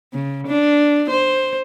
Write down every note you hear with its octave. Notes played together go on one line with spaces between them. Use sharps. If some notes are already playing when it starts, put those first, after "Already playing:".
C#3
D4
C5